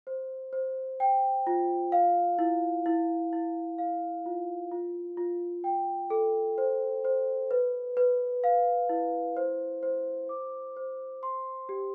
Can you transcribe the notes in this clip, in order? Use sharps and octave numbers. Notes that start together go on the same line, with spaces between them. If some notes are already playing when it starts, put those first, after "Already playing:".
C5
C5
G5
F4
F5
E4
E4
E4
F5
F4
F4
F4
G5
A4
C5
C5
B4
B4
F5
E4
C5
C5
D6
C5
C6
G4